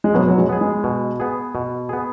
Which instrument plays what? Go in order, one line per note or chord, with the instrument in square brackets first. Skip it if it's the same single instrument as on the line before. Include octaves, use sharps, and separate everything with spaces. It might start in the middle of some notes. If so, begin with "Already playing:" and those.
[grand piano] G#3
[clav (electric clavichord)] B2 [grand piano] F#3 B3
[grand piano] F#3
G#3
[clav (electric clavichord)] B3 G#4
[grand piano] G#3
[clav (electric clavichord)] B2
B3 G#4
B2
B3 G#4